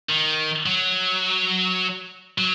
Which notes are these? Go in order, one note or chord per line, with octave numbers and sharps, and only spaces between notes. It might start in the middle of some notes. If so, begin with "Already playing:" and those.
D#3
F#3
F#3